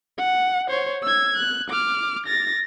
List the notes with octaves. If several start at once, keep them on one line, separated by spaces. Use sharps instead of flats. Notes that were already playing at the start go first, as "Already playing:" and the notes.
F#5
C5 C#5
E6 G#6
F#6
D6 F6
A6 A#6